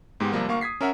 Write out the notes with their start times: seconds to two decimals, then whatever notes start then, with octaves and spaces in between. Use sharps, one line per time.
0.20 G#2 G#3 B3 G4
0.32 C3 F3 G3 A#3
0.48 D2 A#3 F5 C#6
0.61 D#6 G#6 B6 C7
0.81 C#4 A#4 E5 F#5